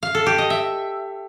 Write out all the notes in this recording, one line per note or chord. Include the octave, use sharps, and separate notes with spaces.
F5
A4
G4
D#5
E5